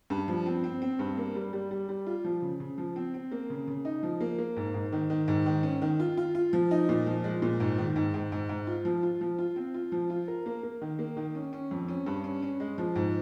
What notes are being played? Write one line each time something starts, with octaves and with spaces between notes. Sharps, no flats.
G2
F3
C4
C4
C4
G2
A#3
G3
G3
G3
G3
F4
F3
C#3
C#3
F3
C4
C4
A#3
C#3
C#3
D#4
F3
A#3
A#3
G#2
G#2
D#3
D#3
G#2
D#3
C#4
D#3
F4
F4
F4
F3
D#4
A#2
F3
G#3
A#2
G#2
D#3
G#2
G#2
G#2
G#2
F4
F3
F4
F3
F4
C4
F4
F3
F4
A#4
A#3
A#3
D#3
A#3
D#3
C#4
C#4
F2
C#4
G2
C#4
C#4
G#3
F3
G#2